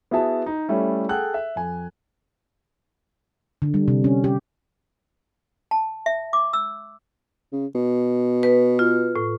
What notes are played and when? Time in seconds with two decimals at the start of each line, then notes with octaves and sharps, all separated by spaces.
0.11 B3 E4 F#4 G#4 E5 A5
0.46 D#4
0.69 G3 A3 C#4 E4
1.09 G#4 A4 F#5 G5 F#6
1.34 E5
1.56 F2 G#5
3.62 D3
3.74 G3
3.88 C3
4.04 C#4
4.24 G4
5.71 A5
6.06 E5
6.33 D6
6.53 E6
7.52 C#3
7.75 B2
8.43 B4
8.79 F4
9.16 A2